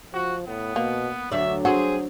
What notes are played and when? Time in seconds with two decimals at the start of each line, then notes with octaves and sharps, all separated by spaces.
0.13 F3 F#4
0.47 A2 B3
0.76 B2 A#3
1.32 D2 F#3 D5 E5
1.65 C4 F#4 G#4